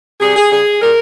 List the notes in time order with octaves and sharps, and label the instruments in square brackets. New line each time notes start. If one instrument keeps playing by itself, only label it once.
[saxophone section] C3 G3 G#4
G#4
C#3 G3 G#4
A#2 G3 A#4